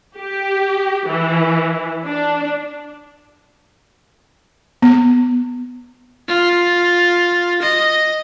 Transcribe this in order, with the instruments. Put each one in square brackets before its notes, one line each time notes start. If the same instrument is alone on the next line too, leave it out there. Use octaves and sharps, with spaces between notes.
[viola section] G4
E3
D4
[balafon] B3
[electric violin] F4
D#5